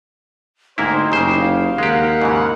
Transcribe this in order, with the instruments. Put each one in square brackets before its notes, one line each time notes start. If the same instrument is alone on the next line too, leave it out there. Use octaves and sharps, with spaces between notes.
[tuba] D2 [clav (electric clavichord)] G#2 A#3 E4 [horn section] C4 C5 [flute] D#4
[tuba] F#1 [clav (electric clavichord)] C#3 C5 [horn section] G4
[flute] F5
[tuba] D#2 [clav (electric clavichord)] G#3 G4 [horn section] A#4 F#5
[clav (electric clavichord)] G#2 C#3 E3